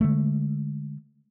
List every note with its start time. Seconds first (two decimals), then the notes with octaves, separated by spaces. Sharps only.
0.01 D3 G#3 A3